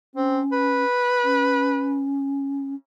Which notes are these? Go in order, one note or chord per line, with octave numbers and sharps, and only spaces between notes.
C4 C#4
B4
C#4